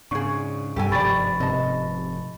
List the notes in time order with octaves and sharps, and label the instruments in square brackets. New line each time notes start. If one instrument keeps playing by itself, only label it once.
[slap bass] G#2 C#3 [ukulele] D4 G#4 [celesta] C#6
[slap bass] B1 D3 [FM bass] G2 [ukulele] G4 A4 G#5
[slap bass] F1 G#2 F3 [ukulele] G4 D5 [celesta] B5 C#6 A6
[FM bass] C3 [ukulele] D#5 A5